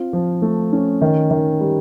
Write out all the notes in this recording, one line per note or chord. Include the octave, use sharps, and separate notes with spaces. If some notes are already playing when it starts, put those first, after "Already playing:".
Already playing: C4 F4
F3
A3
C#4
D#3
D#3
G3